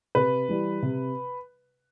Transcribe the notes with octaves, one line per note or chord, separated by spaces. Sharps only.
C3 B4
E3 G3
C3